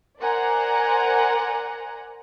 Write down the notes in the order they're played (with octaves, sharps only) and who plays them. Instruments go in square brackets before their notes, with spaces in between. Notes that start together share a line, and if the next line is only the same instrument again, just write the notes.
[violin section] A#4 C5 D5 F#5 G#5 A#5